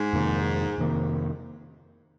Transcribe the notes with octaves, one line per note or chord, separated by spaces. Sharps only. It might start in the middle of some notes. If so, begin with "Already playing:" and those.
Already playing: G#2
F2 C3 D#3 A#3
F2 C3 D#3 A#3